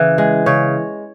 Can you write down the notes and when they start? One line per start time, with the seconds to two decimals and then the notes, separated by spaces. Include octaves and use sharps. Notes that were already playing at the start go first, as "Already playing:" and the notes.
Already playing: C#3 E3
0.18 G#3
0.46 C#3 C#5